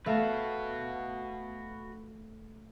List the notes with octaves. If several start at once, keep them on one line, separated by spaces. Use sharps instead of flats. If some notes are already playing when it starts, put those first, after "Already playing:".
A3 F#4 B4 F5 A5